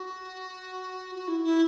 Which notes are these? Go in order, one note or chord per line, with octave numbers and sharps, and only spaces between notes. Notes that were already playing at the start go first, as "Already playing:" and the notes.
Already playing: F#4
F#4
E4
E4